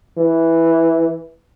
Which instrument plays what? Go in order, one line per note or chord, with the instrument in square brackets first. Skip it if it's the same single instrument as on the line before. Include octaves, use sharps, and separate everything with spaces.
[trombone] E3